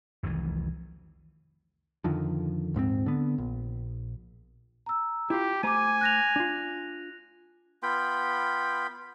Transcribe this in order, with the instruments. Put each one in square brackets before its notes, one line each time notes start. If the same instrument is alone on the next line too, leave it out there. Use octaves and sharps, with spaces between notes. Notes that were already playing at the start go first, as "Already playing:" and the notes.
[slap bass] F1 C2 D#3 E3
[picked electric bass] F2 D3 D#3 F3
D#1 G#2 B3 C4
D3 B3
A#1
[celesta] A#5 E6
[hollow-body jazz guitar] E4 F4 [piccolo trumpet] G4
[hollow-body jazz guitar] A3 C5 A#5 [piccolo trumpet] G#5 [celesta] D6 D#7
[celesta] F#6 A#6 F7
[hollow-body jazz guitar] D4 F4
[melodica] B3 F4 G5 B5